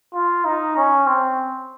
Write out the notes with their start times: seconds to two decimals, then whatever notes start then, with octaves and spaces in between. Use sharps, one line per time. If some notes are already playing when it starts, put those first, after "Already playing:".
0.14 F4
0.45 D#4
0.77 C#4
1.07 C4